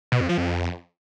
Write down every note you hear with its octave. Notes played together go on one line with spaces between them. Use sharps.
B2
F2
F3
F2